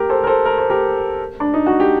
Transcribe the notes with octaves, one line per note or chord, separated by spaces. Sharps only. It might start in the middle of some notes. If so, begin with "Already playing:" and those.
Already playing: G4 A#4
A4 C5
A#4
A4 C5
A#4
C5
G4 A#4
D4
D#4
F#4
G4